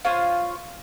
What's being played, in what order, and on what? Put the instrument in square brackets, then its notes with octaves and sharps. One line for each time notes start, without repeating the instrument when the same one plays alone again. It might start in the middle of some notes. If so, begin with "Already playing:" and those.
[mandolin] F4 C5 C#5 C6